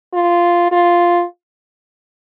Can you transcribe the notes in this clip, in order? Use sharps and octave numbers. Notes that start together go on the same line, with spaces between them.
F4
F4